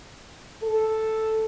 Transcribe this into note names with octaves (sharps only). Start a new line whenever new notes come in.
A4